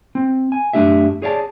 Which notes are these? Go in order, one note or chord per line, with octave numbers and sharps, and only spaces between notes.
C4
G#5
F#2 A3 D4 G4 E5
G#4 C#5 D5 E5 A5